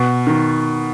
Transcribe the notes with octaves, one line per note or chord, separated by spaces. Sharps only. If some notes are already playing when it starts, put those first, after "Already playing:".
Already playing: B2
D#3